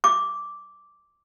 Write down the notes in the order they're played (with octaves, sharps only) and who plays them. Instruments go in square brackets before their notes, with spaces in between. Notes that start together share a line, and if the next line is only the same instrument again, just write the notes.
[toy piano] D6